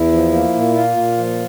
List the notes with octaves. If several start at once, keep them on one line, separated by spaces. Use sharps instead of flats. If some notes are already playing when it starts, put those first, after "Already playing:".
Already playing: E2 E4
F3
A#3
A#2
A#3 F4
A#2
F3